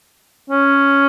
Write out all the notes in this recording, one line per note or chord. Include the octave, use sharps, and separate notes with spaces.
C#4